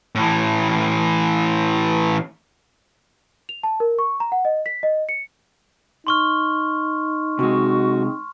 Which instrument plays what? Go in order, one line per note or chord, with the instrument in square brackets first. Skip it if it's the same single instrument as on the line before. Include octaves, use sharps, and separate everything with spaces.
[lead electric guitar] A2 E3
[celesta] F7
A5
A#4
C#6
A#5
F#5
D#5
B6
D#5
C#7
[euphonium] D#4 [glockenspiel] C6 C#6 F6
[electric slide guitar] C3 G#3 [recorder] F#4